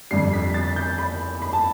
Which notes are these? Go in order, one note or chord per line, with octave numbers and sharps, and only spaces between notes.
F2 D3 G3 C7
B6
A6
G6
B5
B5
A5